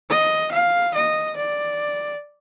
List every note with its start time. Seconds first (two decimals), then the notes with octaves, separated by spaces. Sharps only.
0.10 D#5
0.52 F5
0.95 D#5
1.37 D5